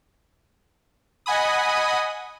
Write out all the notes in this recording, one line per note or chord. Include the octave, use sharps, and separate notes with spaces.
D#5 F#5 G#5 B5 D#6